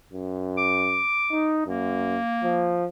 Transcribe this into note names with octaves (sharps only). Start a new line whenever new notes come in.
F#2
D6
D#4
F#2 A#3
F3